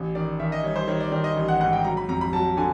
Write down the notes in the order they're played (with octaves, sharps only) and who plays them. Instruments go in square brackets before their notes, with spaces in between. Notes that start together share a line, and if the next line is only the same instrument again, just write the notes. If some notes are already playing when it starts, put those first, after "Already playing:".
Already playing: [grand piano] A1
D#3 D5
D#3 E5
D#5
G3 C#5
C5
D#3 C#5
D5
D#3 D5
D#5
A1
F#5
G#2 F#5
G5
F#3 A#5
B5
F2 A#5
B5
F#3 A5
D3 G#5